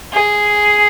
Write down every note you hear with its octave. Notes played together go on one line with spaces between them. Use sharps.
G#4